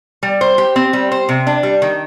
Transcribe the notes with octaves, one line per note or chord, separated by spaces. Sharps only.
G3
C5
G4
C4
G3
C5
C3
D4
G3
D#3